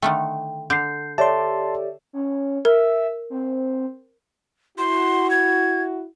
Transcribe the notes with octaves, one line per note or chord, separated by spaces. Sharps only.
D3 D#3 A3 G5
D3 G6 C7
G4 A4 C#5 D5 E5 A5 C6
C#4
A#4 E5
C4
E4 F#4 C6
G#6